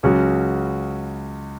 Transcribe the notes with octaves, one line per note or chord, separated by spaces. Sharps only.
C#2 C#3 F#3 C#4 F#4